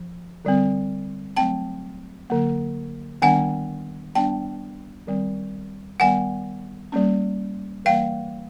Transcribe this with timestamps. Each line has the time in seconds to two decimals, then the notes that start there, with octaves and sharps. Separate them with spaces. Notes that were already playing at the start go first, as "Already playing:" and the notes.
Already playing: F3
0.45 D3 G3 C4
1.36 F#3 A3 C4 G5 A5
2.30 D3 F#3 A#3
3.22 D#3 G3 B3 D4 F#5 G#5
4.15 G3 B3 D4 G5 A5
5.07 D#3 G3 C4
6.00 D#3 G3 B3 F#5 G#5
6.92 G3 A#3 C#4
7.85 E3 G3 A#3 F5 G5